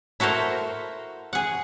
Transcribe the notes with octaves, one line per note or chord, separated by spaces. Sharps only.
E4 F#4 A4 A#4 C5
G#4 F#5